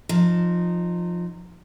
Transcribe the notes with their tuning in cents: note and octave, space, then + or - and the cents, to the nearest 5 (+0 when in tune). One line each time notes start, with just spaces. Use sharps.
F3 +5 D#4 -20